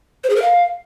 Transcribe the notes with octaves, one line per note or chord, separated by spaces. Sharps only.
C5
G#4
A#4
F5